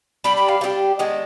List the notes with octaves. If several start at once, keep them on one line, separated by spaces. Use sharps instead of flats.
G3 D4 G4 B5
B5
F5
G3 D4 G4
D#3 G#3 B3 D4